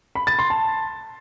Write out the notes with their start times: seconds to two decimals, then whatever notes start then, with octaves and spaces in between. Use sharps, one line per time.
0.15 B5
0.27 A6
0.39 C6
0.50 A5